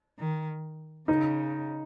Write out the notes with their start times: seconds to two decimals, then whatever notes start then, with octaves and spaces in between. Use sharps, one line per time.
0.18 D#3
1.08 C#3 D#4